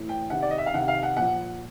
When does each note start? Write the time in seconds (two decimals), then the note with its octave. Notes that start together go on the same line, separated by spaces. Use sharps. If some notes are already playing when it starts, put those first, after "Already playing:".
Already playing: A2 E3
0.09 G5
0.30 C3 D#3 F#5
0.42 D5
0.51 D#5
0.58 E5
0.66 F5
0.74 C3 D#3 F#5
0.88 F5
1.03 F#5
1.17 A#2 F3 F#5